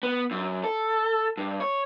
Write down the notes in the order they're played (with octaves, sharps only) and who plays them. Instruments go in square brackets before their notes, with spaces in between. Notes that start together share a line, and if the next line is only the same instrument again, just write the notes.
[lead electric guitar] B3
F#2
A4
G2
C#5